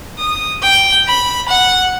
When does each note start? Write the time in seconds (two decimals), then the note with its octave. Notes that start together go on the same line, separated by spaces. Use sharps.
0.19 D#6
0.63 G5
1.07 B5
1.48 F#5